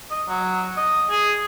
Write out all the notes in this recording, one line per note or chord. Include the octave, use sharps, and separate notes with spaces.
D#5
F#3
D#5
G#4